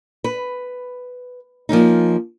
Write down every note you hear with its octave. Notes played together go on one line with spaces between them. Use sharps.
B4
F3 A#3 C#4 D#4